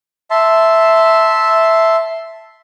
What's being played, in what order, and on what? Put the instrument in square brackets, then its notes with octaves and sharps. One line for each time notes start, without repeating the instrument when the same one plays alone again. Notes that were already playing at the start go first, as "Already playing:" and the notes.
[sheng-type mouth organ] E5 A5 C6